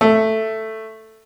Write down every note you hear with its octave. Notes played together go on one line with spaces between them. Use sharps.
A3